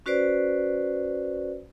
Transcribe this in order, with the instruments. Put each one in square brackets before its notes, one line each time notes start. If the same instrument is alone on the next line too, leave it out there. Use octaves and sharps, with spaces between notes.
[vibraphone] C#4 F#4 B4 C5 D5